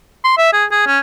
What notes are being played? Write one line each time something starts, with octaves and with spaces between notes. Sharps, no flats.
C6
E5
G#4
G#4
C#4